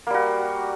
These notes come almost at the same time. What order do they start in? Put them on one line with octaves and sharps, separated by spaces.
A#3 G3 F#4